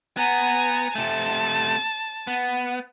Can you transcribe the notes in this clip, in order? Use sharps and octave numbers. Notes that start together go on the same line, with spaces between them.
B3 G#5 A#5
C3 A3 A5
B3